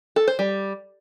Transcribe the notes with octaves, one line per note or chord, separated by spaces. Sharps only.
A4
C5
G3